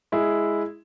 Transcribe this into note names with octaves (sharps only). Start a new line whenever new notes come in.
G#3 E4 G#4